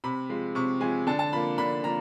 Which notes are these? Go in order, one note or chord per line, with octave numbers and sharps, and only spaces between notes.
C3 B5
F3 G#3
C3 C#6
F3 G#3 G#5
D3 A5
A5
F3 A#3 B5
D3 B5
F3 A#3 A#5